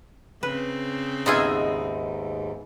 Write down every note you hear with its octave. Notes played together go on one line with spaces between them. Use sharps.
C#3 C4 B4
D#2 G#2 B3 D#4 F4 G#4 D#5 E5